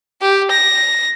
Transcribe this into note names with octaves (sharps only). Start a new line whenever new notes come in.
G4
A#6